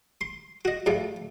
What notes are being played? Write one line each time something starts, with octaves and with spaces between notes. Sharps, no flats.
C6
F#4 D#5
G#2 F3 G3 A3